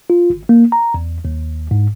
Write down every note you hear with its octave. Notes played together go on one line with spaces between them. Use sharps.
F4
G#1
A#3
A#5
E2
D#2
G#2